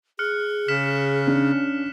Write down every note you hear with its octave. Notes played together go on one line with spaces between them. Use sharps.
G#4 F6 F#6 C#7
C#3 F6 B6 E7
C#4 D4